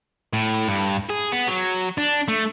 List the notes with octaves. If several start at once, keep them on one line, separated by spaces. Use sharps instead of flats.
A2
G2
G#4
B3
F#3
D4
A3